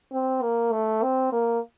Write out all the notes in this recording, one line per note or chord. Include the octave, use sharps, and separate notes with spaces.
C4
A#3
A3
C4
A#3